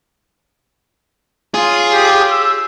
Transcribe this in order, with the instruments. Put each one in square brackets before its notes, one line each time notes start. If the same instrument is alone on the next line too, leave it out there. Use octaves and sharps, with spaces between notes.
[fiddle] F4 C#5 [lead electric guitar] G#4
[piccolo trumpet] G4
E6